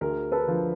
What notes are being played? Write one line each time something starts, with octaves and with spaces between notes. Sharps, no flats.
D2 G#4 A#4
A4 B4
D3 F3